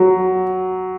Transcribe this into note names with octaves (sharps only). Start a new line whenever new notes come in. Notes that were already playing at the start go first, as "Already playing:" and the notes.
Already playing: F#3